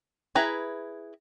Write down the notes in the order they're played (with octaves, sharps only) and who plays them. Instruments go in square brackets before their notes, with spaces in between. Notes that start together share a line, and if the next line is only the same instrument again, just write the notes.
[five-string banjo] E4 G#4 B4 A#5